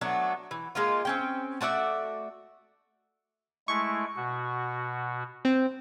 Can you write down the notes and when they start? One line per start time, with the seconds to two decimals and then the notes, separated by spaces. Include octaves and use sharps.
0.01 F#3 A3 B3 D4
0.51 E3
0.75 G#3 A#3 D#4 F4
1.05 C4 C#4 G5
1.61 A3 F#4 D5 E5
3.68 G#3 A3 E4 C#6
4.16 B2 F#4
5.45 C4